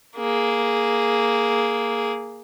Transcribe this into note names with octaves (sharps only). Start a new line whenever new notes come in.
A#3 G#4